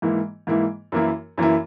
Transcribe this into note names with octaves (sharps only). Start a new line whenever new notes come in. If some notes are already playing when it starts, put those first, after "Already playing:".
G#2 E3 A#3 E4
G#2 E3 A#3 E4
F#2 E3 A#3 E4
F#2 E3 A#3 E4